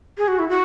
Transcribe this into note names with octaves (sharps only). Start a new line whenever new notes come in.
G#4
F#4
E4
F#4